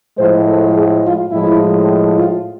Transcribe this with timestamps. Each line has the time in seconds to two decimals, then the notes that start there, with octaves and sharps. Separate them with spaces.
0.18 A2 F3 G#3 C5
0.47 A4
0.75 G#4
1.04 F4
1.31 A2 F3 G#3 E4
2.17 F4